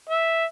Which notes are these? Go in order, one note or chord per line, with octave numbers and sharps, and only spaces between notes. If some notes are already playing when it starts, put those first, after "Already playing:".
E5